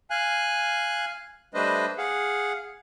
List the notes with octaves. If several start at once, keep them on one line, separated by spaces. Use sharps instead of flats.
F5 G#5 F#6
G3 A3 D4 B4 C5 D#5
G#4 F5 F#5